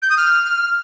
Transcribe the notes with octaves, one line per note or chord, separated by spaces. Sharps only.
G6
D#6
F6